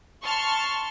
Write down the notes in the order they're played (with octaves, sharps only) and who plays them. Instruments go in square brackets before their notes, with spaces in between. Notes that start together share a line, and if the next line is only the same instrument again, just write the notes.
[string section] A5 C6 C#6 F6